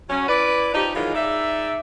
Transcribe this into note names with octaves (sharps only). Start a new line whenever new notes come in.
F#3 C#4
E4 B4 D5
F3 D#4 G4
D#3 E3 F#3 G#3 D#4 F4
G#3 D#4 D5 E5